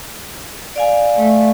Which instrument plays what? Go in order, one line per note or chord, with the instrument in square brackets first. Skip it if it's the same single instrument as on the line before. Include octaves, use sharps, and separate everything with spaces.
[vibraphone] D5 F5 G#5
[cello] A3